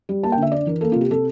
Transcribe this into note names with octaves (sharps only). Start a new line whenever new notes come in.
G3
A#3 A5
G5
D3
E5
D4 D5
E3 A#4
A#3 A4
F4
C3
G4
C3 A4